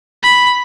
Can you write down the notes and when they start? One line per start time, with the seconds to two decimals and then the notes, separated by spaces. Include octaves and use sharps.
0.23 B5